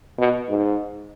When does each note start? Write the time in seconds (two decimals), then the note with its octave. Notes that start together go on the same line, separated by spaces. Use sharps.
0.19 B2
0.49 G#2